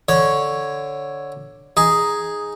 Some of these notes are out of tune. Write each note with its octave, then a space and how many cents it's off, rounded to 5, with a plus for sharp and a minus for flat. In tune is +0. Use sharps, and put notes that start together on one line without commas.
D3 +0 C#5 +0
D#4 +0 G#4 +0